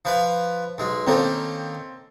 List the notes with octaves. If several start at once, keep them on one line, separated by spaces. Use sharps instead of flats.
F3 B4 F5
B1 G#3
D#3 A#3 C4 C#4 A4 C5